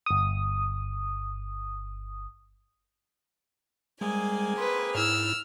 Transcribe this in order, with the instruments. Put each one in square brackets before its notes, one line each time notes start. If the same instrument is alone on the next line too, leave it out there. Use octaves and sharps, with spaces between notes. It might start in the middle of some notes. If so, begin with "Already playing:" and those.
[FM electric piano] G1 D#6
[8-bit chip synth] G3 G#3 [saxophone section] A#3 C4 G#4 [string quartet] G#5
[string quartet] B4 [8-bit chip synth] C6
[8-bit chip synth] G#2 E4 [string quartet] E6 F6